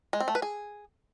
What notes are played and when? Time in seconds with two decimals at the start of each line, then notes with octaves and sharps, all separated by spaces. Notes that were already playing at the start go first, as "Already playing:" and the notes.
0.13 G#3
0.20 C4
0.28 A3
0.35 B4
0.42 G#4